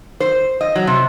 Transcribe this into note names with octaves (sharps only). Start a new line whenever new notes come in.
C5
D#5
F#3
C3